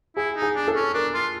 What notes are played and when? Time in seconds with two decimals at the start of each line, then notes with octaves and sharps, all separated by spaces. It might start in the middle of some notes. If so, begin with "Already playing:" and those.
0.16 E4 G#4
0.35 D#4
0.42 G#4
0.55 D4
0.68 A4
0.75 C#4
0.94 D4 A#4
1.14 F4